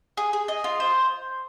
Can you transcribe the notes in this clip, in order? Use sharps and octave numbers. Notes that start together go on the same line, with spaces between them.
G#4
G#4
D#5
F4
C5